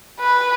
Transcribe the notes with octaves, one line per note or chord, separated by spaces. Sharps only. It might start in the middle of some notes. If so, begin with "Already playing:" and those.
B4